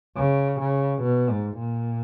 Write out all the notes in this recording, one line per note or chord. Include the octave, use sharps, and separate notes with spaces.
C#3
C#3
B2
G#2
A#2